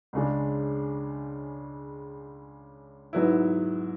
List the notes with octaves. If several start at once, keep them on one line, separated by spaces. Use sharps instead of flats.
C#2 C#3 G#3 D4
G#2 F#3 B3 E4